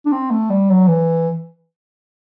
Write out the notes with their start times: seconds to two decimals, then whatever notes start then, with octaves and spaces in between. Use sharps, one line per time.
0.06 D4
0.12 C4
0.31 A3
0.50 G3
0.70 F#3
0.88 E3